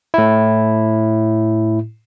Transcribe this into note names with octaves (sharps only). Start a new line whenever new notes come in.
A2 E4